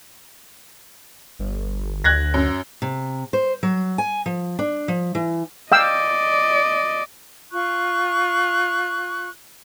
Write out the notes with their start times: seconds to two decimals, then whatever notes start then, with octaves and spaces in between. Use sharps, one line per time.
1.39 G1
2.04 D2 F#6 G#6 A#6
2.34 F#2
2.82 C3
3.33 C5
3.63 F#3
3.98 G#5
4.26 F3
4.59 D4
4.88 F3
5.15 E3
5.72 D5 D#5 F5 G5 E6
7.53 F4 C#6 F#6